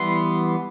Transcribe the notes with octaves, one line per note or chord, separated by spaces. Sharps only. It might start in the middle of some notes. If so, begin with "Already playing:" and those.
Already playing: E3 G3 B3 C6